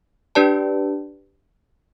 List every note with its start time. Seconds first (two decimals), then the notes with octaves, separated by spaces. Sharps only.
0.35 D4 G4 B4 D5 A5